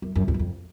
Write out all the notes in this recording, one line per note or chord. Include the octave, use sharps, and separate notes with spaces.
F#2
F#2
E2
F#2
F2